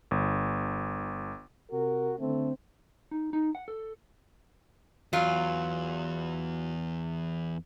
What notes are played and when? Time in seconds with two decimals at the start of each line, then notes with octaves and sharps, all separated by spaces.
0.11 G1
1.71 C3 F#4 A#4
2.19 D3 A3 C4
3.11 D#4
3.33 D#4
3.55 F#5
3.68 A4
5.13 E2 F#3 F4